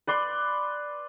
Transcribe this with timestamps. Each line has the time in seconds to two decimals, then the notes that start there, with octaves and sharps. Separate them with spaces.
0.07 B4 D5 C6